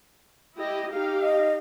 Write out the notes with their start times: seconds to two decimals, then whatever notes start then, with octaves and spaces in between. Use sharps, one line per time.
0.56 E4 G4 D#5
0.92 D#4 G4 F5
1.23 D#5